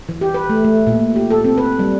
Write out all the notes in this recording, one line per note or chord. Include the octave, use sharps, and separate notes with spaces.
E3
G4
B4
A3
A3
A#2
G4
A4
C4
B4
G3